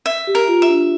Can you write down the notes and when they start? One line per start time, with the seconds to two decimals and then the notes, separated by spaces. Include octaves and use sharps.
0.06 E5
0.27 G4
0.35 A#4
0.48 F4
0.62 E5
0.69 D4